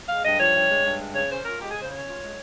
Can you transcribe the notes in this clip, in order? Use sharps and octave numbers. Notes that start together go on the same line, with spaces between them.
G#3 F5
G2 D#5
F3 C#5
G2
G#3
G2
G#3
C#3 C#5
C#4 C5
F4 A#4
G#3 G4
G#4
C#3 C5
C#4 C#5
F4
G#3